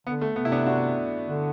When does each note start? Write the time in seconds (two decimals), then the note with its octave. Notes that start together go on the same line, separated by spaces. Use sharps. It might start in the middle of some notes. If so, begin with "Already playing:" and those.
0.07 D3 B3
0.21 A3
0.36 C3 B3
0.45 E4
0.51 B3 D4
0.66 D4 F#4
1.27 D3